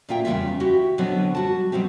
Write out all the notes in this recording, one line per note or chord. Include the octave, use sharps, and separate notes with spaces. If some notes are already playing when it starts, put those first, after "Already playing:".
A#2 A#3 F4 E5 G5
E2 C#3 G3 A3 F4 E5
E4 F#4 G4
B2 D3 F#3 B3 C4
G3 F#4 A5
B2 F#3 G3 C4 G4